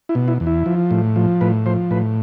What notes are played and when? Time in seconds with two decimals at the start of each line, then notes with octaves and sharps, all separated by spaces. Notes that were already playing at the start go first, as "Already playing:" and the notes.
0.09 E4
0.15 B2
0.28 E4
0.40 E2
0.46 E4
0.66 F3
0.91 A2
1.16 F3
1.41 A2 B4
1.66 F3 C5
1.91 A2 B4